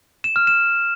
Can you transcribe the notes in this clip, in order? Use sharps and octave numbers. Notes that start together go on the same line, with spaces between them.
E7
F6
E7